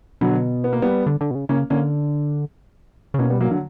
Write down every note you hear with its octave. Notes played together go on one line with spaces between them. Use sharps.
B2 D3 F#3
B3
A#3
G3 B3
D3
D3
B2
C#3
C#3 A#3 C#4
D3 A#3 C#4
C#3
B2 A#3 C#4
G3 B3
F#3 A#3
D3 F#3